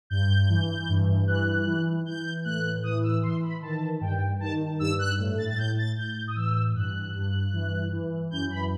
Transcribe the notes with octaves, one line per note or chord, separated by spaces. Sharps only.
G2 G6
E3
G2
E3 F#6
E3
E3 G6
A2 F#6
E3 D#6
E6
E3 C6
B5
D#3 A5
G2 G5
D#3 A5
G2 E6
F#6
A2
A6
A6
A2 G6
A6
A2 G6
D#6
E3 E6
G2 F#6
G2
E3
E3
F#2 G6
B5